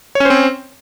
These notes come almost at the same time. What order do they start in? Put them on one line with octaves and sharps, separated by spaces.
C#5 C#4 C5 C4